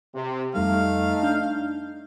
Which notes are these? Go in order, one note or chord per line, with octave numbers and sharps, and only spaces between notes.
C3
F2 G3 A3 D#4 F5
D4 G6